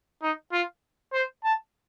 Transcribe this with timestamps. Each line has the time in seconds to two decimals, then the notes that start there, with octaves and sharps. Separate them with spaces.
0.22 D#4
0.52 F4
1.13 C5
1.44 A5